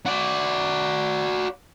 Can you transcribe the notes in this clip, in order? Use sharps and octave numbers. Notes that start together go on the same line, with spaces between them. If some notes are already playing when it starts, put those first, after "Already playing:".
F#4 D5